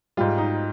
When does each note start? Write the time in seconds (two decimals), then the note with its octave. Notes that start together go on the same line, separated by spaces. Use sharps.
0.17 G#2 G3 F4
0.38 D#4